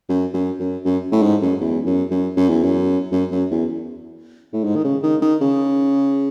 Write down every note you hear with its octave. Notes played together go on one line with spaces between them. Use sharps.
F#2
F#2
F#2
F#2
A2
G#2
F#2
E2
F#2
F#2
F#2
E2
F#2
F#2
F#2
E2
A2
G#2
D#3
C#3
D#3
D#3
C#3